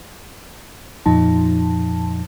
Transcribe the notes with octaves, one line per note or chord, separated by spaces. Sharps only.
F2 A#2 F3 D#4 A5